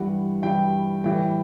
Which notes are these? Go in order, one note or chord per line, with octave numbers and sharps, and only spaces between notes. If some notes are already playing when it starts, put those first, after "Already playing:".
Already playing: G2 E3 G3 F#5
G2 E3 G3 G5
A2 E3 G3 G5